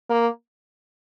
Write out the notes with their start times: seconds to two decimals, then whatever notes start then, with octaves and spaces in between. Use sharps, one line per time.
0.10 A#3